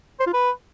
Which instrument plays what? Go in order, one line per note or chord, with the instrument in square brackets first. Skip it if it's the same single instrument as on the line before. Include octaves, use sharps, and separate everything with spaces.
[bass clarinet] C5
F4
B4